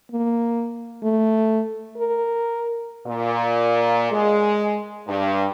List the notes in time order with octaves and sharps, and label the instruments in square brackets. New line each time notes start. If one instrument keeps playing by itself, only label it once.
[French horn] A#3
A3
A#4
[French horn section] A#2
G#3
G2